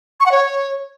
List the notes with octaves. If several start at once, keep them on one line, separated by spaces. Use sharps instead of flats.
C#6
F#5
C#5